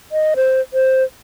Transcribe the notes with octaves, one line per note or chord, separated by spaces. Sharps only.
D#5
C5
C5